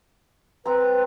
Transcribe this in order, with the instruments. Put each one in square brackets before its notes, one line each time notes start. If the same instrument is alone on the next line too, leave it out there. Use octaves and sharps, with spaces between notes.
[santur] C4 A#5 [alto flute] B4